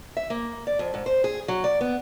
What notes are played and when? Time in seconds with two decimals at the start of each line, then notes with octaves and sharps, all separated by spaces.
0.17 E5
0.30 A#3
0.67 D5
0.79 F2
0.94 G#2
1.06 C5
1.24 G#4
1.48 F#3
1.64 D5
1.81 B3